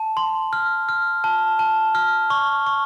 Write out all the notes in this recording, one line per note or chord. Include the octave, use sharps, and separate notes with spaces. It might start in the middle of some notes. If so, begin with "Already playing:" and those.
Already playing: A5
C6
F6
F6
A5
A5
F6
C#6
C#6